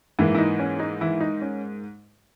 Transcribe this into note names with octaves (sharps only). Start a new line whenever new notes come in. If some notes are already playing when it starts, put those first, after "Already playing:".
G#2 E3 A#3 E4
E4
D#4
C#4
D#4
E3 E4
D#4
C#4